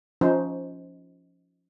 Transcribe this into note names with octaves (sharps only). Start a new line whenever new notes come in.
F3 C#4 D#4 C5